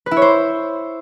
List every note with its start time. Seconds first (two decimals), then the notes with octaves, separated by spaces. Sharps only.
0.06 B4
0.11 E4
0.17 C#5
0.22 C5